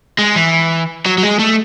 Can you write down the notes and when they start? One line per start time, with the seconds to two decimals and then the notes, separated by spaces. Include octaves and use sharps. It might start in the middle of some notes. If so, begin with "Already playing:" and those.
0.19 G#3
0.36 E3
1.06 F#3
1.18 F#3
1.23 G#3
1.39 A3